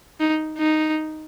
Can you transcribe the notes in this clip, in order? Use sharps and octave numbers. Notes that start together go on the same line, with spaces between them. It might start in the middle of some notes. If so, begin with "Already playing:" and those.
D#4
D#4